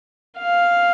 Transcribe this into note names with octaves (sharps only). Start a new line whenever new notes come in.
F5